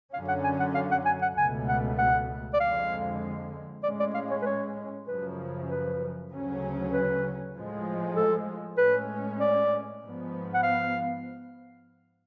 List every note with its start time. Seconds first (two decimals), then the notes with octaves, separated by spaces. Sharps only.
0.14 F#2 D3 F#3 C#4 F5
0.28 F#5
0.44 G#5
0.60 F#5
0.74 F5
0.91 F#5
1.05 G#5
1.22 F#5
1.37 C#2 B2 A3 G#5
1.68 F#5
1.98 F#5
2.53 D5
2.60 F2 D3 G#3 F5
3.83 A2 G#3 C#4 D5
3.99 D5
4.14 F5
4.31 C#5
4.42 B4
4.46 C#5
5.07 F#2 C#3 F3 B4
5.69 B4
6.31 D2 C#3 F#3 C#4
6.92 B4
7.54 A2 F3 G#3
8.16 A4
8.77 A2 G#3 C#4 B4
9.40 D5
10.01 G#2 F3 B3
10.54 F#5
10.63 F5